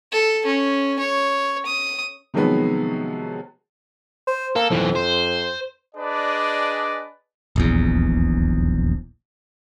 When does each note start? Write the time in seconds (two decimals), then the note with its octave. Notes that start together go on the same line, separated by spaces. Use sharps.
0.12 A4
0.46 C#4
0.99 C#5
1.66 D#6
2.34 C3 D#3 F3 F#3 G#3 B3
4.27 C5
4.56 A#3 A4
4.71 B1 F2 E3
4.96 C5
5.95 D4 G#4 B4 D5 D#5
7.56 D#1 A#1 E2